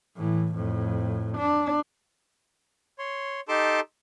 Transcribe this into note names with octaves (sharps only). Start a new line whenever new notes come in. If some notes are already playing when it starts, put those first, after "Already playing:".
A2 E3
F2 A2
D4
C#5 C6
D#4 G4 A4 A5 C6 D6